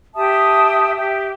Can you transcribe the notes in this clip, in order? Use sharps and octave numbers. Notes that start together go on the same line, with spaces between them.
G4 E5 A5 D#6
G4 E5